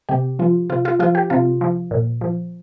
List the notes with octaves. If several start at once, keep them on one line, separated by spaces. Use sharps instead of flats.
C3 G4
F3 F4
C3 F4
F4
F3 F4
G4
C3 F4
F3
A#2
F3